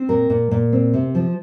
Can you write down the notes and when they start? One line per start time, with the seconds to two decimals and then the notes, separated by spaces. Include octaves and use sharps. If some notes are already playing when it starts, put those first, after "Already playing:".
Already playing: C4
0.09 A#2 A#4
0.30 A#2
0.51 A#2
0.73 C4
0.94 C3
1.15 F3